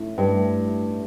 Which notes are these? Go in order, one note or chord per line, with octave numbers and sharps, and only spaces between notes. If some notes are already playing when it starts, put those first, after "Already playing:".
Already playing: A2 A3
G2